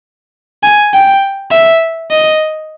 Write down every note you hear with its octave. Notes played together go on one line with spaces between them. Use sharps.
G#5
G5
E5
D#5